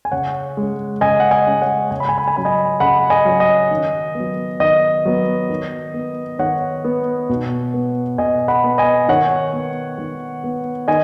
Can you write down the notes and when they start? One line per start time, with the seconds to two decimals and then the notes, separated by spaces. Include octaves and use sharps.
0.05 G#5
0.11 C#3 C#5 F#5
0.57 G#3 C#4
1.01 C#3 D#5 G#5
1.20 F#5
1.31 D#5 G#5
1.47 G#3 C#4
1.62 C#5 F#5
1.91 C#3 G#5
2.00 B5
2.09 G#5
2.18 B5
2.28 G#5
2.36 F#3 C#4 B5
2.45 D#5 G#5
2.80 C#3 F#5 B5
3.10 D#5 G#5
3.25 F#3 C#4
3.40 D#5
3.71 D#3
4.15 B3
4.20 F#3
4.60 D#3 D#5
5.05 F#3 B3
5.49 D#3
5.94 B3
6.39 D#3 C#5 F#5
6.84 B3
7.29 B2
7.74 B3
8.18 B2 D#5 G#5
8.48 F#5 B5
8.64 B3
8.78 D#5 G#5
9.08 D#3 C#5 F#5
9.53 B3
9.98 D#3
10.44 B3
10.88 D#3 D#5 G#5